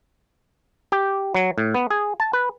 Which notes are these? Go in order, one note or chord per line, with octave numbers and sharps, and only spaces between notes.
G4
F#3
A2
B3
G#4
A5
B4